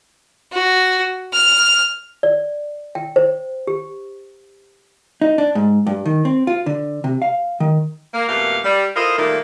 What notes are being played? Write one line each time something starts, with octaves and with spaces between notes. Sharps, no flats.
F#4
F6
D5
G5
C5
G4
D#4
D4
G#2
G2
D#3
C4
F4
D3
C3
F5
D#3
A#3
F2 B2 A3 A#3 G4 F5
G3
E4 F4 A4 A#4 C5 D#5
A#2 D#3 G3 A3 A#3